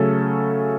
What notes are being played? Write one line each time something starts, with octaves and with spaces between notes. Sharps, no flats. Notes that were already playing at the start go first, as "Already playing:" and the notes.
Already playing: C#3 F#3 A3 C#4 A4